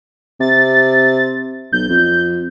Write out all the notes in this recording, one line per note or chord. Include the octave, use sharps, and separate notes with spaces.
C3 A6
B1 G6
F2